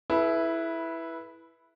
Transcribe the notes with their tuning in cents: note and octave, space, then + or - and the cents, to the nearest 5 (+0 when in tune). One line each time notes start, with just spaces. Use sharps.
E4 +0 G#4 +45 B4 -15